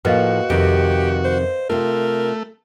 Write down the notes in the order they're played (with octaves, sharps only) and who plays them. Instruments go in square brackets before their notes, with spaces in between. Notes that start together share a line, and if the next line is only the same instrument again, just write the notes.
[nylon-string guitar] A2 F3 A#3 [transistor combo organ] F#4 [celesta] B4 D#5 F5
[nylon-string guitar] F2 C3 D#3 [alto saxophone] G4
[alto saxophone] C5
[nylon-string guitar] C3 F4 [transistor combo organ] A3 [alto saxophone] A#4